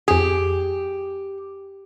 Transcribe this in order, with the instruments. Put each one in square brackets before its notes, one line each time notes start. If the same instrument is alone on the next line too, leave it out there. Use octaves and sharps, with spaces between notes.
[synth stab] F2 G#4 [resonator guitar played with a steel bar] G4